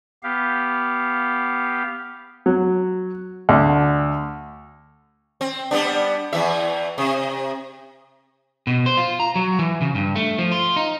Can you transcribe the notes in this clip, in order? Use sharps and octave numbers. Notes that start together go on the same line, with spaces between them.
B3 G4 F5
F#3
D2
C4
G3 B3 D4
E2 E3 E5
C3
B2
C5
F4
A#5
F#3
E3
C#3
G2
A3
F3
F4
D#4